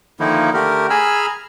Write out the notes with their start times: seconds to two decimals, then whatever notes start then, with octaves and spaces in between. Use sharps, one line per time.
0.20 D3 D#3 F3 A#3 D#4 E4
0.54 D3 A3 G4 A#4
0.90 G#4 G#5 A#5 B5 E6 F6